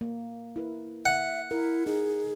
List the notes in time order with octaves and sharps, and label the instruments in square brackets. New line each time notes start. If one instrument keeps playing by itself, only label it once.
[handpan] A#3
E4 A#4 B4
[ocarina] E5 [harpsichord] F#5
[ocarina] E4 [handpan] A#4
[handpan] D#4 [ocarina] G#4